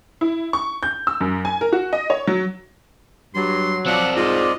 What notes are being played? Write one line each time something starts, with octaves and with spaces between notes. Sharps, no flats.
E4
C#6
G6
E6
F#2
G#5
A#4
F#4
D#5
C#5
F#3
G2 F#3 C6
F3 C4 D5 F#5
G#2 F4 D#5